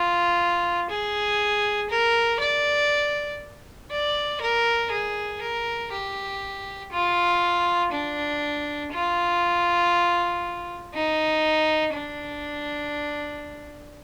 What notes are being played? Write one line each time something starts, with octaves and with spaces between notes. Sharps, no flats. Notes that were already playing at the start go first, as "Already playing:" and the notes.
Already playing: F4
G#4
A#4
D5
D5
A#4
G#4
A#4
G4
F4
D4
F4
D#4
D4